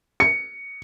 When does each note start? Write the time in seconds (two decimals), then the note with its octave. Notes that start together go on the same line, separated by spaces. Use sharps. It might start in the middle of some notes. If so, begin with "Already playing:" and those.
0.20 C#7